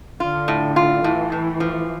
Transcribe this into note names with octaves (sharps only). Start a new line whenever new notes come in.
D3 F4
A2
F4
A2 E3
A2
F3